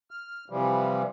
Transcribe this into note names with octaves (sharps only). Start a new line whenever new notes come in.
F6
C3 E3 F3 G3